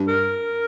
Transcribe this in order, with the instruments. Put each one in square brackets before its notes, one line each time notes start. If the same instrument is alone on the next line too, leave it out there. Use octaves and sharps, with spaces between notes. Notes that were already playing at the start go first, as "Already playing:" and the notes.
Already playing: [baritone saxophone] G2
[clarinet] A#4